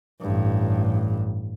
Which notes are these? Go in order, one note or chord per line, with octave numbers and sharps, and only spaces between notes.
A1 G2